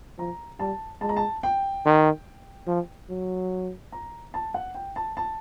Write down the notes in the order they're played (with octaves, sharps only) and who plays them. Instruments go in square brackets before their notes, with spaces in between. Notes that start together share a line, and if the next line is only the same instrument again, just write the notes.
[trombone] F3 [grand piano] A#5
[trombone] G3 [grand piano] A5
[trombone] G#3 [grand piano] A5
[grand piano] A#5
A5
G5
[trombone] D#3
F3
F#3
[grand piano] A#5
A5
F#5
G5
A5
A5